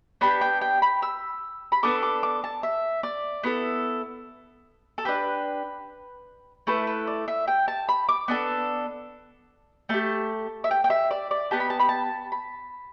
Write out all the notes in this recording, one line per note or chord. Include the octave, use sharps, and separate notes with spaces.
B3 D4 G4 B5
G5
G5
B5
E6
B5
B3 D4 A4 D6
D6
D6
A5
E5
D5
B3 E4 A4
A4
D4 G4 B4
A3 E4 A4 B4
B4
D5
E5
G5
A5
B5
D6
B3 D4 A4
A3 G4 A5
E5
G5
G5
E5
D5
D5
B3 G4 A5
B5
A5
B5
A5
B5